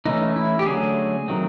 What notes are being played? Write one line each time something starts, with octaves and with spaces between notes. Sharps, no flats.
E3 A3 C#4 D#4
E4
G4
D3 F#3 A3 C#4 G#4
D#3 F#3 A3 C4